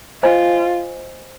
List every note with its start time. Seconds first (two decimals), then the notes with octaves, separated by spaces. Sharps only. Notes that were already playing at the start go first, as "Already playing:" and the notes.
0.23 F4 C5 D#5 G#5